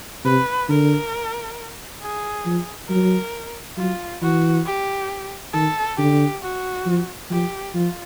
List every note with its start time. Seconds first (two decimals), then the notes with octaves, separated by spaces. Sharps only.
0.25 C3 B4
0.69 D3 A#4
2.02 G#4
2.46 F3
2.89 F#3 A#4
3.77 F#3 F4
4.22 E3 F#4
4.66 G4
5.53 D#3 A4
5.98 D3 G4
6.42 F#4
6.86 F3
7.30 F3 G4
7.74 F3 F4